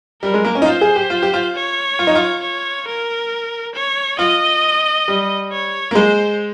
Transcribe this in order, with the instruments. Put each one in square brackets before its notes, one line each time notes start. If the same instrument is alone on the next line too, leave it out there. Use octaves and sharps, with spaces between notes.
[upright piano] G3 [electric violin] A#4
[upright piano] G#3
A#3
C#4
D#4
[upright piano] F4 [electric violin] C5
[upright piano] G#4
G4
F4
G4
F4
[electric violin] C#5
[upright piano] F4
D#4
F4
[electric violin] C#5
A#4
C#5
[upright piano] F4 [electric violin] D#5
[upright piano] G3
[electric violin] C#5
[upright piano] A#3
[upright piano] G#3 [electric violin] C5